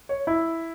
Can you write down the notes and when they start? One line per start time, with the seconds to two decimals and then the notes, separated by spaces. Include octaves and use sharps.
0.09 C#5
0.27 E4